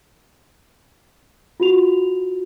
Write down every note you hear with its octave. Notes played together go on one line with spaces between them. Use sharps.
F4 F#4 F7